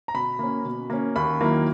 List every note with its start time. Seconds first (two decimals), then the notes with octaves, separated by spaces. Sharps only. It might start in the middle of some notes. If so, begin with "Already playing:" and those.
0.08 A#5
0.14 B2 B5
0.39 A#3 C#4
0.65 B2
0.90 A#3 C#4
1.16 D#2 B5
1.41 D#3 F#3 A#3 E4